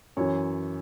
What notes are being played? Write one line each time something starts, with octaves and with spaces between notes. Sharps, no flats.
F#2 E3 C#5